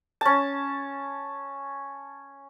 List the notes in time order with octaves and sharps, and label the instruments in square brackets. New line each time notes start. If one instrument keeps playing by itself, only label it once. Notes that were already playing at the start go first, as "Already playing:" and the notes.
[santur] C#4 A5